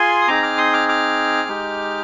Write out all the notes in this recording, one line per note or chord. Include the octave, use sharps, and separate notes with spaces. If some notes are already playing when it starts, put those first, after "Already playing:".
Already playing: F4 G#4 G#5 C6
D#6
C4 D#4 G#4 A#5 D6
D6 F6
C6 D#6
D6 F6
D6 F6
G#3 D#4 G4